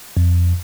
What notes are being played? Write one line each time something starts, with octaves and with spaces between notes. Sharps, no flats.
F2